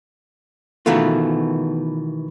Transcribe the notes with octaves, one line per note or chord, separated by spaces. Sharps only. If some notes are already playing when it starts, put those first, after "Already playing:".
B2 D#3 E3 A3 B3 F4